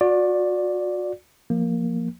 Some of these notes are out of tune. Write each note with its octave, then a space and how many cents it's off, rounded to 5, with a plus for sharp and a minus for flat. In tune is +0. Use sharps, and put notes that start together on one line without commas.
F#4 -35 D5 +0
F3 +0 A#3 +0